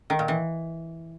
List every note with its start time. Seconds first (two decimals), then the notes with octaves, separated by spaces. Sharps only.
0.10 D#3
0.19 A#2
0.28 E3